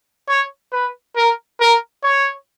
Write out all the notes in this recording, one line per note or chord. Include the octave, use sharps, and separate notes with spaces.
C#5
B4
A#4
A#4
C#5